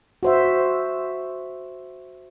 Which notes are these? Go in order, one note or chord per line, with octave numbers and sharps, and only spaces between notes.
F#4 C5 E5